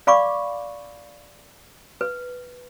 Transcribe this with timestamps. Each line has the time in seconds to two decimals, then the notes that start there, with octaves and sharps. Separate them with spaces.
0.07 D5 F5 B5 C#6 D6
2.01 B4